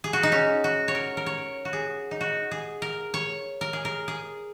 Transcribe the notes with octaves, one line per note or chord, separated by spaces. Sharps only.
G#4
F#4
D#4
C#4
F#4
C#5
A#4
A#4
C#5
F#4
G#4
D#4
F#4
G#4
A#4
C#5
A#4
G#4
A#4
G#4